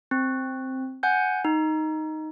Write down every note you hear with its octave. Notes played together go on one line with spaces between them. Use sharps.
C4
F#5 G#5 G6
D#4